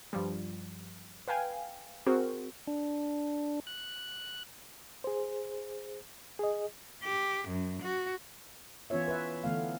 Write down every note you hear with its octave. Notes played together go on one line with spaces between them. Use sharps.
G2 F3 G3
B4 F5 G5 G#5
C4 F#4 G#4 A#4 C5
D4
F#6
G#4 C5
G#4 D#5
G4
F#2
F#4
E3 B3 C#4 F4 C#5 E5
B4 E5
D3 E3 A3 B3 F5